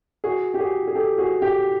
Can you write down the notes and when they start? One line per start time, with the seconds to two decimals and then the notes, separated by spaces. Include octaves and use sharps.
0.24 F#4 G#4
0.54 G4
0.59 F#4 G#4
0.88 G#4
0.95 G4 A4
1.18 F#4 G#4
1.42 G4